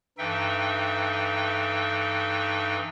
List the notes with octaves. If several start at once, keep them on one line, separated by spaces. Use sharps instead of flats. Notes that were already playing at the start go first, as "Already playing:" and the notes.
G2 E3 D#4 A4 E5 G5